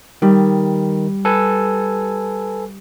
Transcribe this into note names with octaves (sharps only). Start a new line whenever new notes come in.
D#3 G3
A4 B4 G#5